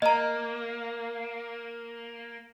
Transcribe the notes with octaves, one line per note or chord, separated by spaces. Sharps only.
A#3 D#5 A#5